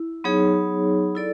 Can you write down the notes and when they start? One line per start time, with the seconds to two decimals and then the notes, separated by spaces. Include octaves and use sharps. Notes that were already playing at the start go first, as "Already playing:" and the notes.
Already playing: E4
0.24 F#3 B3 D#4 G#4 C#5
1.15 E4 A4 D5